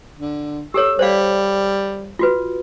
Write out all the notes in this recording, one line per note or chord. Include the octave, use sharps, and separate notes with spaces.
D3
G4 A4 C#5 E6
G3 C5 D5 F5
F4 F#4 B4